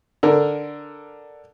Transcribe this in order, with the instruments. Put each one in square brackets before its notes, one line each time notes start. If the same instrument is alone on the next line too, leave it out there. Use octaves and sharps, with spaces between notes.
[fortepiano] D3 A#4